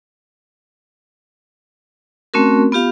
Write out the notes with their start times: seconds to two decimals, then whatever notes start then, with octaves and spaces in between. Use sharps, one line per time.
2.34 A3 C4 C#4 F#4 A#4
2.72 B3 F4 G4 F5